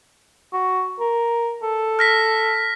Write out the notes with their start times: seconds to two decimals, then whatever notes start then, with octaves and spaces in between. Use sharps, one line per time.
0.53 F#4
1.00 A#4
1.63 A4
1.99 F6 A#6 B6